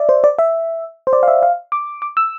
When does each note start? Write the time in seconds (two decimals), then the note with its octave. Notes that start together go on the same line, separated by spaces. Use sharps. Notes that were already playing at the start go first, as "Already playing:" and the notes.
Already playing: D5 E5
0.09 C5
0.24 D5
0.39 E5
1.07 C5
1.13 D5
1.23 F5
1.28 E5
1.43 F5
1.72 D6
2.02 D6
2.17 E6